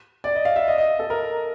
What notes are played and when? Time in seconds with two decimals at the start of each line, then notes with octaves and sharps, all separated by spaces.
0.24 D5
0.35 D#5
0.45 F5
0.56 E5
0.68 D#5
0.78 D#5
0.99 A4
1.10 A#4